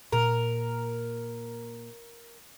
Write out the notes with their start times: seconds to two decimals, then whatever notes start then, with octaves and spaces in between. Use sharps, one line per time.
0.12 A#2 A#3 A#4